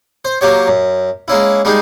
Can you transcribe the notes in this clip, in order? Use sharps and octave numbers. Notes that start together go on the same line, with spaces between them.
C5
F#3 A#3 G4 C#5
F#2
G#3 A#3 C#4 E4
G3 G#3 A#3 D#4